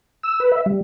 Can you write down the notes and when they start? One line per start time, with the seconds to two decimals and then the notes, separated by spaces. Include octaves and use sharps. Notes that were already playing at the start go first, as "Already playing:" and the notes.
0.23 E6
0.40 B4
0.52 E5
0.66 G3